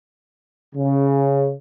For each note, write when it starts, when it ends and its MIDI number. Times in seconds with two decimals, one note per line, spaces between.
0.75 1.52 49